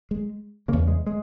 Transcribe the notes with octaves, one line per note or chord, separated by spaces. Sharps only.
G#3
E2 C#3 A#3
G#3
G#3